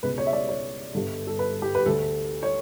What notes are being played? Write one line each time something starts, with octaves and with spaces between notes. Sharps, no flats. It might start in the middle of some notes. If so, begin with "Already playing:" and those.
C#2 B2 B4
C#5
E5
D5
C#5
G1 G2 D3
A4
B4
G4
B4
D2 D3 A4
C#5